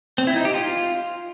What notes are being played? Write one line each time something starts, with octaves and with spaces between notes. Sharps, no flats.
C4
E4
D#4
G4
F4